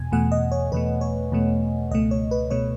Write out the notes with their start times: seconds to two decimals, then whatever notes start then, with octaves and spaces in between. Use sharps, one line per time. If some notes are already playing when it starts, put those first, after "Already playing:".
Already playing: E2 B2 G#5
0.12 E2 B2 A3 F#5
0.32 D#5
0.52 C#5
0.72 E2 B2 A3 B4
1.01 C#5
1.32 E2 B2 A3
1.91 C#2 B2 A3 D#5
2.11 C#5
2.31 B4
2.50 B2 A3 C#5